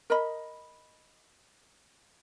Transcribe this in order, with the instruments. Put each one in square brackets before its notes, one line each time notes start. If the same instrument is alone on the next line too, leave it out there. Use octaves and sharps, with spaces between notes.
[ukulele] A#4 D#5 B5